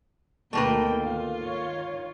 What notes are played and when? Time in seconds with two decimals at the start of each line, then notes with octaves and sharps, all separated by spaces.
0.53 D2 B2 D#3 A3 A#3 A#4 B4 G5
1.01 F4
1.42 D#3 C#5